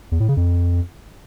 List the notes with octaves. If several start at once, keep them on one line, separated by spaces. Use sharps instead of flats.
E2
A2
C#3
F2